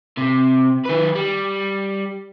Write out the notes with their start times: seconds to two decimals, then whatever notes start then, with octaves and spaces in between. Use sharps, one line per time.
0.18 C3
0.86 D#3 B4
1.15 G3